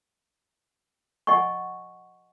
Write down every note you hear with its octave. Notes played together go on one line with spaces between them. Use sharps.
D#5 F#5 G#5 C#6